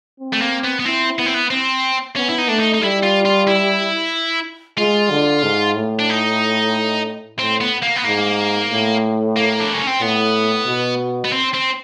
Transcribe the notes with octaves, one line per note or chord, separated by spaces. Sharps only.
C4
A3
A#3
B3
B3
C4 E4
B3
C4
B3
C4
B3 C#4
E4
D#4
A3 D4
D#4
D#4
G3 E4
F4
F4
E4
G#3 F4
D3
G#2
A2
D4
D#4
A2 C4
B3
A#3
B3
G#2 A#3
A2
A#3
D4
C#4
C4
A2 B3
B2
B3
C4
C4